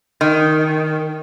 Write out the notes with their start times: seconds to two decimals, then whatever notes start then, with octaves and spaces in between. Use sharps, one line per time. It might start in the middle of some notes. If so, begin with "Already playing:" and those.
0.21 D#3